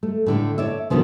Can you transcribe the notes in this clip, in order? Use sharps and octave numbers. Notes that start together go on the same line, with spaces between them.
A3
A2 D3 A3
C#5 D5 E5
D2 B2 D3 D#3 F3